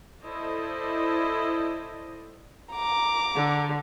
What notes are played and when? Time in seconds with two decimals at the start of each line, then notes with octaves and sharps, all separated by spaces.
0.22 E4 A4 C5 D5 D#5
2.72 A#5 D6
3.36 D3